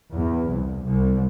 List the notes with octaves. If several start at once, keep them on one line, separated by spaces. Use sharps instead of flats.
E2
C2
C2